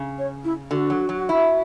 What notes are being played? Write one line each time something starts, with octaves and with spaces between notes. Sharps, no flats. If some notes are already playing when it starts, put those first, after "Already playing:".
Already playing: C#3
C#5
E4
D3 F#4
F#3
F#3
E4